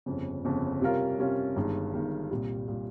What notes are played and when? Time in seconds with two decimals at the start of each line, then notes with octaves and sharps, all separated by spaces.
0.06 G1 F2 C#3
0.45 G1 F2 C#3
0.81 C3 G3 C#4 F4 A#4
1.19 C3 G3 C#4 F4 A#4
1.56 G1 G2 D#3 G#3
1.93 G1 G2 D#3 G#3
2.31 C2 A#2 G3
2.68 A#2 G3